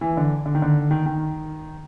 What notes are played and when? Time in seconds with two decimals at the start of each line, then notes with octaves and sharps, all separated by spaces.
0.01 E3
0.17 D3
0.46 D3
0.55 D#3
0.62 D3
0.91 D#3
1.06 D#3